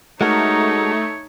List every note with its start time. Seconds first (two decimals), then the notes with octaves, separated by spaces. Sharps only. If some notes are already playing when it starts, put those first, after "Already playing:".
0.21 G#3 A3 D#4 F#4 A#4 C#5